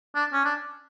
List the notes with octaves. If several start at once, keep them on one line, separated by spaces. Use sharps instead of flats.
D4
C#4
D4